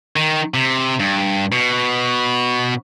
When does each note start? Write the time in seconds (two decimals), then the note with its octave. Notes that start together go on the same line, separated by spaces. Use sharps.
0.16 D#3
0.54 C3
0.99 G2
1.52 B2